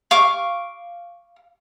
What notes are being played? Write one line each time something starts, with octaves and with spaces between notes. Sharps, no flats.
F5 C#6 D6